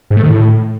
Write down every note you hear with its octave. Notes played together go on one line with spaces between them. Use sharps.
G#2
A3
D#3
A2